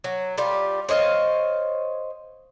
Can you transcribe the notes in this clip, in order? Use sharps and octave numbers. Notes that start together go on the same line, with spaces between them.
F#3
G3 F4 G4
C5 C#5 D#5 F5